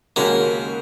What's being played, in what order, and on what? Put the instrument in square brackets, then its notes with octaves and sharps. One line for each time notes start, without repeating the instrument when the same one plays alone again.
[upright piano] D#2 C#3 G#3 C#4 F#4 [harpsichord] A#3